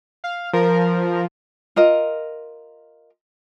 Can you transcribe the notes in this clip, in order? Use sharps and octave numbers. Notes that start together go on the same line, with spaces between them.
F5
F3 A#4
F4 A#4 D#5